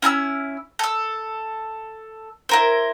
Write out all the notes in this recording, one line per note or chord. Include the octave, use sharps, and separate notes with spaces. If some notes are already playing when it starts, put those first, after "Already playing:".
C#4 E4 A5 E6
A4 E6
E4 A#4 C5